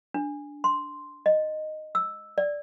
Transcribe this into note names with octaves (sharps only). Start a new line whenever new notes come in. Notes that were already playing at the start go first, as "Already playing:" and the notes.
D4
C6
D#5
E6
D5